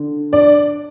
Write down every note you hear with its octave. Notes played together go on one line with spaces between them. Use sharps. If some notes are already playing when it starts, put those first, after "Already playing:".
Already playing: D3
D4 D5